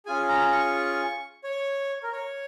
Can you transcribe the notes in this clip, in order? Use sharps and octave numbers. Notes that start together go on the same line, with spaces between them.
C#4 F4 G#4 G#5
A#5
C#6
C#5
A#4
C#5